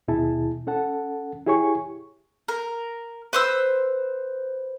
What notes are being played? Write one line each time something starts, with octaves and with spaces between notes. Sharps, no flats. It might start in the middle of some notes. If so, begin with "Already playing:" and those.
D#2 B2 E4 G#4 A5
C#4 A4 F#5 A5
E4 G4 G#4 C#5 G#5 C#6
A#4
B4 C5 E6